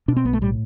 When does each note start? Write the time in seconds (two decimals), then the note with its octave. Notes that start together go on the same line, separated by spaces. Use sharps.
0.08 B2 D4
0.16 C4
0.25 B1 B3
0.33 A3
0.41 A2 G3